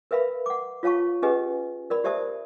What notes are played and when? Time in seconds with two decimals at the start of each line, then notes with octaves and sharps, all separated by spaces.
0.11 A#4 B4 E5 F5 B5
0.46 F#5 D6
0.83 F4 C#5 F5 A5 C#6
1.22 C#4 G4 G#4 B4 D#5 G#5
1.90 A#4 D5 B5
2.04 G4 C5 D5 E5 A5 D#6